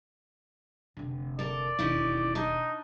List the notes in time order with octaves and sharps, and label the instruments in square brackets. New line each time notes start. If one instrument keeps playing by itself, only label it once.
[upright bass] F1 D3
[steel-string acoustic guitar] A4 A#4 [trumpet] D5
[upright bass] E1 D#2 [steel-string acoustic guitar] C#4 D#4 E4
[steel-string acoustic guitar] D4 C#5 D#5 [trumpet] D#4